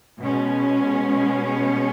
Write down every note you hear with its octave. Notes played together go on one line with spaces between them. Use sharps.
B2 G#3 C#4